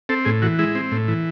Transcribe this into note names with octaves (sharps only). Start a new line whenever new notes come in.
C4 A4
A2 G#4
E3 F#4
G#3 E4
C4
A2
E3